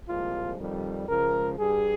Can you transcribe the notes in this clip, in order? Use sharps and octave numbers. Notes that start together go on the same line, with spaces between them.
C2 A#2 F3 G#3 F4
F2 D#3 G3
C#2 C#3 F3 G#3 A#4
G2 G3 G#4